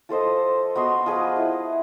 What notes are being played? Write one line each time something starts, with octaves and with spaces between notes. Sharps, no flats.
F3 A4 C5 D#5
B3 F#4 D#5 C6
F3 G#4 B4 D#5
E4